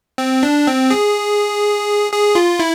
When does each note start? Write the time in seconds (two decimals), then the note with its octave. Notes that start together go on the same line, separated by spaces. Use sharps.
0.18 C4
0.43 D4
0.67 C4
0.90 G#4
2.12 G#4
2.35 F4
2.60 E4